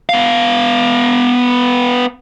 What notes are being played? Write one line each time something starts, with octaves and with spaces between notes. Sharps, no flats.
B3 F5